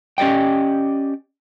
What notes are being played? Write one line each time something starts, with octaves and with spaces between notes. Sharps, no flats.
C#4 G4 D5 D#5 G5